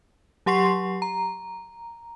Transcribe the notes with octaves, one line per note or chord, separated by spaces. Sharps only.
F#3 G4 F#5 C6 C#6 C7
A#5